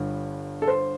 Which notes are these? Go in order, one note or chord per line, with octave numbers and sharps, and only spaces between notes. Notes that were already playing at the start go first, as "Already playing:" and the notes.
Already playing: G1 G2 D3
A4
C5